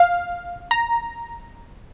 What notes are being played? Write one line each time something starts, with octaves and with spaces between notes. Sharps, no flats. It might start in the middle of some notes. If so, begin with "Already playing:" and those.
Already playing: F5
A#5